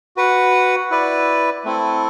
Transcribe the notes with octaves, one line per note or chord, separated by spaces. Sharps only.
F#4 B4 F#5
E4 B4 D5
A3 C4 E4 A4